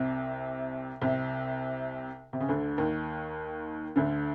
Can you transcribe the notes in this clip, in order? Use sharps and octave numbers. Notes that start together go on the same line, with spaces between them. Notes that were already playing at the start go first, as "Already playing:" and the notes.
Already playing: C2 C3
C2 C3
C3
C#3
D2 D3
D#2 D#3
D2 D3